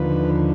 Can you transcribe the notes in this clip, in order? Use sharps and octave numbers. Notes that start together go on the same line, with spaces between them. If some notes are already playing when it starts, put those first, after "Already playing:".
Already playing: D#2 D3 F3 B4